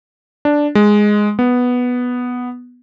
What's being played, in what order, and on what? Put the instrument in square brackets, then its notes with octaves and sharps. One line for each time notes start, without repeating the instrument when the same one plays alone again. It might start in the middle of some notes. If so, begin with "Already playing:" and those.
[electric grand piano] D4
G#3
B3